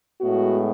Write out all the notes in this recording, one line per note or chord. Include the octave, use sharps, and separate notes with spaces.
A2 G#3 B3 F#4